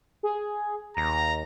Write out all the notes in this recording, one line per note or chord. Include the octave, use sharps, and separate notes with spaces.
G#4
D#2 A#5 A#6